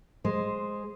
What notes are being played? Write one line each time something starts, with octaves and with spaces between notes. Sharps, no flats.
G#3 G#4 C5